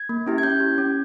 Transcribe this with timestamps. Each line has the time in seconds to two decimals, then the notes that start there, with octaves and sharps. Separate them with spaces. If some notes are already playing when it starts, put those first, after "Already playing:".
Already playing: G#6
0.09 A#3
0.27 C#4 E4 G4
0.38 G#6
0.43 C#4 G6
0.60 G4
0.78 C#4